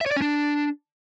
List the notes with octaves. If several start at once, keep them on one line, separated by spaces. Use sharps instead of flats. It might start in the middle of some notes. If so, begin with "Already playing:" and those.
E5
C#5
D5
C#4
D4